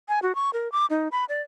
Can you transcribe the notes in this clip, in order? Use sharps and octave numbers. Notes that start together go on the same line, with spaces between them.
G#5
F#4
C#6
A#4
D6
D#4
B5
D5